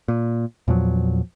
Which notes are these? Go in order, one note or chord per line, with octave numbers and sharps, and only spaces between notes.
A#2
E2 A#2 F3 F#3